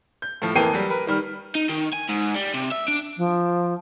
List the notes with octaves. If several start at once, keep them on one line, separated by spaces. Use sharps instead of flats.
G6
A2 F3
F2 E3 A#3 G5 C7 D#7
F#3 G3
A#4 B4
D#3 G3 F6
D#4
D#3
G#5
G#2
G3
C3
E5
D4
F3